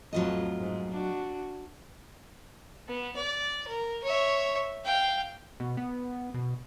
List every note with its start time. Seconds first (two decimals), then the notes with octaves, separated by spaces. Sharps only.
0.13 F2 A2 F#3 F4 D#5
0.60 G#2
0.91 D4 F#4
2.87 B3
3.16 D5
3.67 A#4
4.03 C#5 E5
4.84 F5 G5
5.60 B2
5.77 B3
6.34 B2